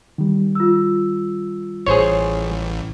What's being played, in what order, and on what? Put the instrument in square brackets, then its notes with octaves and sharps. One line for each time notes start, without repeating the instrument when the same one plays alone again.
[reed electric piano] D#3 G3
[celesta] F4 E6
[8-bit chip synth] A1 [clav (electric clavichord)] G#4 C5 C#5